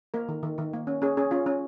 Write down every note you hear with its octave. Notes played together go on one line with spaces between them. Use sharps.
A#3 A#4
D#3
D#3
D#3
A#3
C#4
C#4 G#4
C#4 G#4
C#4 F4
C#4